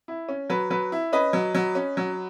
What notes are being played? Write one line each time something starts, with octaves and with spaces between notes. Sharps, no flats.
E4
C#4
F#3 B4
F#3 B4
E4
C#4 B4 D#5
F#3
F#3
C#4
F#3